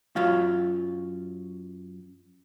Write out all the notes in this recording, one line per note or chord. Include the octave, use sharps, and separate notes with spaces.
F#2 F#3 F4 F5